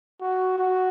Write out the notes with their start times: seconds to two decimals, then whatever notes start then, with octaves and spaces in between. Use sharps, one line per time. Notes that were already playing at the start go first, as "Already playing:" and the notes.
0.21 F#4
0.59 F#4